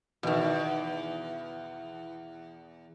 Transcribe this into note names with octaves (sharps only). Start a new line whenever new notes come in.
E2 B2 D#3